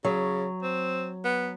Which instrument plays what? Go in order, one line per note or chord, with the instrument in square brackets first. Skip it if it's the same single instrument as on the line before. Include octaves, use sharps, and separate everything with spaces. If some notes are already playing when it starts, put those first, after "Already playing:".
[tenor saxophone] C#3 [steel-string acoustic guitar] F#3
[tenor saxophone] C4
B3